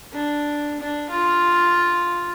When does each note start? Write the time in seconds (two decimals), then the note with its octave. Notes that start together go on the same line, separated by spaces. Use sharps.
0.13 D4
0.81 D4
1.10 F4